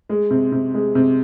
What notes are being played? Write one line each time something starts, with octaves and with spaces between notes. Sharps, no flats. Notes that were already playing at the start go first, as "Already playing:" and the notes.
G#3
C3
C3
G#3
C3